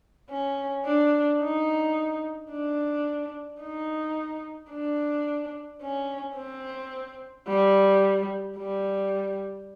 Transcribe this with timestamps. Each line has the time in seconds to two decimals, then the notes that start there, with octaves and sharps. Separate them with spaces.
0.30 C#4
0.86 D4
1.41 D#4
2.51 D4
3.62 D#4
4.72 D4
5.82 C#4
6.36 C4
7.47 G3
8.58 G3